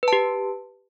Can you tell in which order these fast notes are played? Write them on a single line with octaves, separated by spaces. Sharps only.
B4 A5 G4